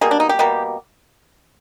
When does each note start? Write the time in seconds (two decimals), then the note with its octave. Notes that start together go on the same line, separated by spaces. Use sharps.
0.01 B2 G3 A#3 G#4
0.11 D4
0.20 D#4
0.29 G4
0.39 B2 G3 A#3